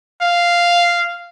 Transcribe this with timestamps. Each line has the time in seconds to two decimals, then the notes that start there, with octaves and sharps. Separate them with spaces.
0.21 F5